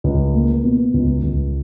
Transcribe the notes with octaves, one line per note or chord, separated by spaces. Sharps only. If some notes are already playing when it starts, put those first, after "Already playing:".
C#2
A#3
B2
C#2
C#2